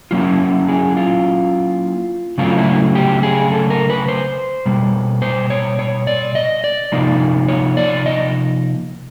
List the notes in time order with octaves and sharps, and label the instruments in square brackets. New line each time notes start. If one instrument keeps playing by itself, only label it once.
[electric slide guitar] F#3 A#3 C#4 E4 F4
G#4
F4
C#3 F#3 A3 C4 F4
E4
G4
G#4
A4
A#4
B4
C5
B2 G3 A#3
C5
C#5
C#5
D5
D#5
D5
C3 F3 A#3 D#4
C#5
D5
D#5